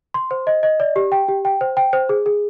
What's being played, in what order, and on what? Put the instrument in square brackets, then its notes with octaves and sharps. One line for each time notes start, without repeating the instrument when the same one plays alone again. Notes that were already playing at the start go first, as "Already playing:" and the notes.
[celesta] C6
C5
D#5
D#5
D5
G4
G5
G4
G5
C5
G5
C5
G#4
G#4